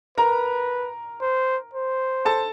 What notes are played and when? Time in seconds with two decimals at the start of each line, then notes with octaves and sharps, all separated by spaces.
0.17 A#4 B4 A#5
1.21 C5
1.74 C5
2.25 A4 A5